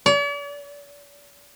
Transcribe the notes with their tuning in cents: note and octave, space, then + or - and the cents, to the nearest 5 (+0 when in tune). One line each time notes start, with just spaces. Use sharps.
D5 -45